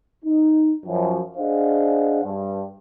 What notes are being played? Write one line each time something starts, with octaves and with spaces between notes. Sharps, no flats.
D#4
F#2 F3
D4 G#4 C5 D#5 F5 F#5
G2